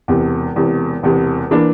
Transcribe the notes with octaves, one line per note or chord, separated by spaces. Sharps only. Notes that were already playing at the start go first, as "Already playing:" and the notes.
E1 E2 C3
E1 E2 C3
E1 E2 C3
E3 A#3 D4